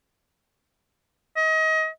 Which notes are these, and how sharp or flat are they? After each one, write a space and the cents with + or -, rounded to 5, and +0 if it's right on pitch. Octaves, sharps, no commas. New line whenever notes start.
D#5 +30